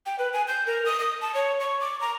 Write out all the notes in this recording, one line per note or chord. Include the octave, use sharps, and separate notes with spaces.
G5
B4
G#5
G6
A#4
D#6
D#6
A5
C#5
C#6
D6
A#5